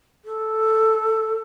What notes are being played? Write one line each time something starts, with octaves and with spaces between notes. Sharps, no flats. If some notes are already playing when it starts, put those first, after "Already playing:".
A4